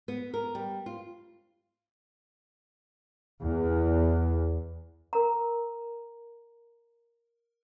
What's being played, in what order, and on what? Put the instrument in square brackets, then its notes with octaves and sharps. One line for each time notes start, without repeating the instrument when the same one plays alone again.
[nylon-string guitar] B3
A#4
G3
F4
[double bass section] E2
[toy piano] A#4 A#5